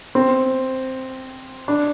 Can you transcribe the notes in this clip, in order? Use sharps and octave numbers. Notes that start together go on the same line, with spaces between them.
C4
D4